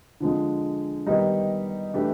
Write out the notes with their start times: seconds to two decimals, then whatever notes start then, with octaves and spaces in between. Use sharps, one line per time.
0.20 D3 F3 G#3
1.07 D#3 G3 B3 D#4 G4
1.94 E3 A3 D4 G4